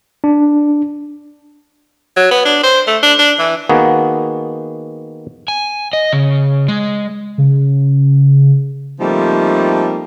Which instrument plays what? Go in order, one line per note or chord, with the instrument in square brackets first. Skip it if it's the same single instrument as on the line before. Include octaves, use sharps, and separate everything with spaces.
[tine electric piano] D4
[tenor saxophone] F#3
B3
D4
C5
A3
D4
D4
E3
[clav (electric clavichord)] D#3 A#3 B3 F#4 G#4
[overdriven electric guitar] G#5
D#5
C#3
G#3
[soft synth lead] C#3
[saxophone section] F3 G3 A3 A#3 C4 D#4